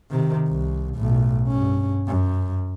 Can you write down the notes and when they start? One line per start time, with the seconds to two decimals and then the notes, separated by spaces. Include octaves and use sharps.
0.11 C3 D#3
0.47 C2
0.95 B1 A2
1.48 G2 C#4
2.08 F#2